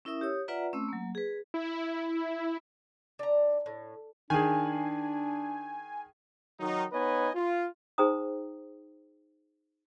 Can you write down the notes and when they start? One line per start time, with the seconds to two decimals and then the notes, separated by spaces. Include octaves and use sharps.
0.05 C#4 E4 A#4 E5 D#6 E6
0.21 G4 C#5 D#6
0.48 F4 B4 D5 E5 F#5 A#5
0.73 A3 C4 C#4 E6
0.88 F#3 A#3
1.15 G#4 B4
1.54 E4
3.19 D4 A#5
3.66 A2
4.30 D#3 D4 G#4 G#5
6.60 D#3 F#3 D#4
6.92 B3 D#4 B4 C#5 D#5 G#5
7.35 F4
7.98 D#4 G#4 C5 G5 A#5 D#6